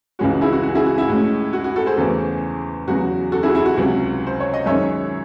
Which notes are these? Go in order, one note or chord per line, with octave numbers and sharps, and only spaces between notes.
C#2 C#3 E3 G#3 C#4 F#4
E4 G#4
F#4
F#4
E4 G#4
F#4
E4
A2 G#3 C#4
F#4
F#4
F#4 A4
G#4 C5
E2 C#3 E3 A3 C#4
E2 C#3 F#3 F#4
F#4 A4
E4 G#4
F#4
E4 G#4
F#4
C#2 C3 F#3 C#4
C5
C#5
D#5
F#2 D#3 G#3 C#4 C#5 E5